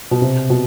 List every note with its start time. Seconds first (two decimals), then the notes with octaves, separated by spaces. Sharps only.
0.11 B2
0.22 C3
0.50 B2